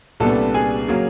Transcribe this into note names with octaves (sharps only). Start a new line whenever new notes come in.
C2 A#2 G3 B3 D4 A4 A5
G#4 G#5
C#3 F#3 A#3